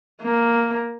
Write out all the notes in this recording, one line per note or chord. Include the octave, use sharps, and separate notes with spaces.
A#3